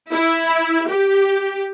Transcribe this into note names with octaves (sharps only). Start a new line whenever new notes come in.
E4
G4